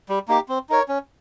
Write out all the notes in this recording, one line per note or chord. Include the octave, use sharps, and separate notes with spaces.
G3
A#3 D#4 G4
C4
D#4 A#4 C#5
C#4